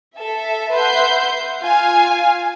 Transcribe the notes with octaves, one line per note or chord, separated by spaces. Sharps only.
A4 E5
B4 E5 F#5 C6 G6
F4 F5 G#5